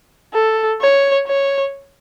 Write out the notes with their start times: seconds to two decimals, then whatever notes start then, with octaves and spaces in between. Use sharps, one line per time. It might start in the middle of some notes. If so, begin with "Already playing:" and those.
0.33 A4
0.81 C#5
1.27 C#5